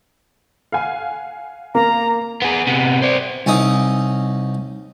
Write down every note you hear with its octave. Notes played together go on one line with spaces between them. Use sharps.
F5 F#5 G#5
A#3 A#5
B3 G#4
C3 B3
C5 D5
C2 C#4 D#4 D#6